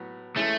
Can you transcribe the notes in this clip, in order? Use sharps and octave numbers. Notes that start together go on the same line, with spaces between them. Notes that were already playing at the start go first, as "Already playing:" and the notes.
Already playing: A2 F#3 B3
E3 G#3 A3 C#4 E4